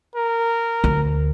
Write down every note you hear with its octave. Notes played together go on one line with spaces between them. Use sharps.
A#4
D2